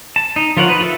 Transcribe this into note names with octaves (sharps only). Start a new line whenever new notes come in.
A5
D#4
F3 F4 A#4 C#5 F#5
D#4 B4
F4 A4 E5